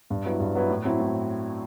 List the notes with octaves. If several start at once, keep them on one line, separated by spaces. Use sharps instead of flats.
G2
F#3 B3 E4
G2
F#3 B3 E4
A2
F#3 C4 E4
A2